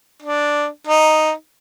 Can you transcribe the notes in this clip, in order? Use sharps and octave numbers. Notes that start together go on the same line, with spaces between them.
D4
D#4